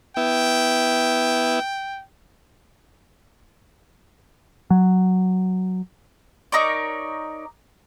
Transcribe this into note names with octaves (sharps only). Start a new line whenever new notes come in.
B3 E4 G5
F#3
D#4 A#4 C#5 D5